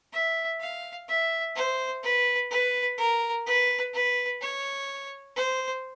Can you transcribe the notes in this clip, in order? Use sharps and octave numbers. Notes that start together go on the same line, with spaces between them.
E5
F5
E5
C5
B4
B4
A#4
B4
B4
C#5
C5